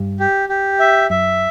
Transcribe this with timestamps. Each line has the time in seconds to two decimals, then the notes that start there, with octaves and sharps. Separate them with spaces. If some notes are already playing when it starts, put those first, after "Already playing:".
Already playing: G2
0.20 G4
0.49 G4
0.79 E5
1.10 F#2 E5